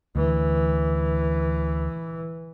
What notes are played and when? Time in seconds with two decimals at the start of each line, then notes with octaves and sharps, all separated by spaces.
0.16 D2 E3